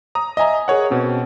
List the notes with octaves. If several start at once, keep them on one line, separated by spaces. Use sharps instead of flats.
A#5 D#6
D#5 E5 G#5 A#5
G#4 A#4 C#5 F#5
B2 C4 C#4